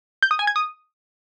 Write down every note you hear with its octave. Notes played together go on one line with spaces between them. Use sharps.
G6
D#6
G#5
G#6
D#6